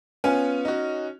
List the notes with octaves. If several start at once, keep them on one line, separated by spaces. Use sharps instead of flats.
B3 C#4 F4 G#5
D#4 F#4